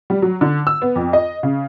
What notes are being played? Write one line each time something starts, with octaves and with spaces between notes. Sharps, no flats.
G3
F#3
D3
E6
B3
F2
D#5
C#3